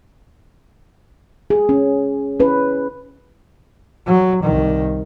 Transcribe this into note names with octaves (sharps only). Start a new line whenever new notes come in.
G#4
C#4
C#4 E4 B4
F#3
C2 D#3